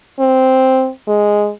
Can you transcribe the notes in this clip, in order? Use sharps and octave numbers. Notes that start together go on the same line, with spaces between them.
C4
G#3